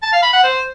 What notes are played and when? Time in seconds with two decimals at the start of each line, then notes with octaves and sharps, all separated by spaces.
0.03 A5
0.13 F5
0.23 B5
0.33 F#5
0.43 C5